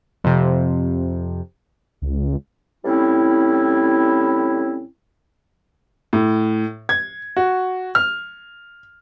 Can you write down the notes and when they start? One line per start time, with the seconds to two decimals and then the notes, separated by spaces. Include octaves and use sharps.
0.24 F2 C3
2.02 C#2
2.85 A2 G3 C4 C#4 E4
6.13 A2
6.89 G#6
7.37 F#4
7.95 F6